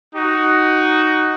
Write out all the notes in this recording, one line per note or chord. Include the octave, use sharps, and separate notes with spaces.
D#4 F#4